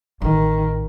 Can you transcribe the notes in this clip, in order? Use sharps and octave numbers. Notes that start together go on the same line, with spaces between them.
A1 D#3